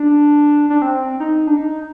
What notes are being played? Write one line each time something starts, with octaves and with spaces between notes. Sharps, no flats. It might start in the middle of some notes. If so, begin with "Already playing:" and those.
Already playing: D4
D4
C4
D#4
D4
D#4